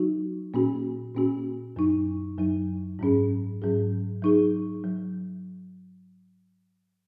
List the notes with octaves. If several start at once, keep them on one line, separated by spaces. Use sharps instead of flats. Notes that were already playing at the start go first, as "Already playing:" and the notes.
Already playing: F#3 D#4 F#4
A#2 A#3 C#4 F#4
A#2 A#3 C#4 F#4
F#2 F#3 D#4
F#2 F#3 D#4
G#2 F#3 C#4 G#4
G#2 F#3 C#4 G#4
F#3 D#4 G#4
F#3